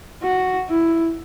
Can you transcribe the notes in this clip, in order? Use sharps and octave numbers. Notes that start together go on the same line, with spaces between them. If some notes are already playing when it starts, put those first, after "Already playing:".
F#4
E4